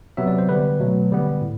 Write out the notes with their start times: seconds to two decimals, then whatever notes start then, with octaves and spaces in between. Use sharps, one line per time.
0.17 C3 F#3 B3 E5
0.27 D5
0.38 C5
0.49 D3 G3 B3 B4
0.79 B2 F#3 A3
1.11 D3 G3 B3
1.41 A2